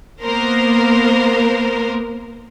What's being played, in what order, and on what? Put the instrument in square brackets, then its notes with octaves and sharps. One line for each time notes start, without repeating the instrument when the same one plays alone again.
[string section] A#3 B3 A#4 C5